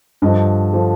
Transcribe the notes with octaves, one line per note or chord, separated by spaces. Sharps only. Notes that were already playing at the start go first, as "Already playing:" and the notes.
G2 D3 F3 D#5
D3 F3